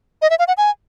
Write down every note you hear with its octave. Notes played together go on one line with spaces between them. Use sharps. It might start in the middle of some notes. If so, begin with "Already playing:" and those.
D#5
E5
F5
F#5
G#5